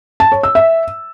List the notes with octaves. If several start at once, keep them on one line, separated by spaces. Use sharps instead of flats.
A5
C#5
E6
E5